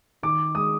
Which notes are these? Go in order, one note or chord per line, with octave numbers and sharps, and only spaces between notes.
D#3 D6
G#3 D#6